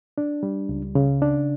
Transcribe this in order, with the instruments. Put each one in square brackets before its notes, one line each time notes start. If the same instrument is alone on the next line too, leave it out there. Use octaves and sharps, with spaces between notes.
[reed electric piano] D4
G3
C#2
C#3
D4